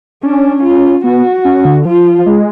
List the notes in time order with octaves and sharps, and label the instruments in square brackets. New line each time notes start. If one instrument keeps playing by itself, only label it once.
[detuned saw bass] C#4 [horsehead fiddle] D4
[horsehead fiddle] F4
[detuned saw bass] B3 [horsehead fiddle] F#4
[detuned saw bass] C#4
D3
[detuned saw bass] F3 [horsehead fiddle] F4
[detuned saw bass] G#3